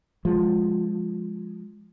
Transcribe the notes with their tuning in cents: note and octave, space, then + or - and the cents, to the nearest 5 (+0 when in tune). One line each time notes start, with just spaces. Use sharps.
F3 +10 G#3 +0